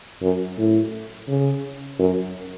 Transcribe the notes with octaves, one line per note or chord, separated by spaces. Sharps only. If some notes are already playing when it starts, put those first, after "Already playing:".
F#2
A2
C#3
F#2